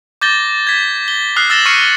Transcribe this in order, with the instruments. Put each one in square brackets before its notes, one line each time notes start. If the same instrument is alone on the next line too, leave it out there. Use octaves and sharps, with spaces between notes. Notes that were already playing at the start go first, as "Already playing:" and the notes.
[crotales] D6 G6 A6 A#6 G7
G#6 B6
G7
D#6 F6 F#6 C7
E6 A6 A#6 E7
C#6 F6 C7 C#7 D#7